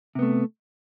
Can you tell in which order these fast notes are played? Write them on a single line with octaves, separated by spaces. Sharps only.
C3 B3 A3